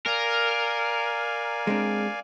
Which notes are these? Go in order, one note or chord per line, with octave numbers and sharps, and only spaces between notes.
A#4 D5 F5 G#5
G#3 C4 D4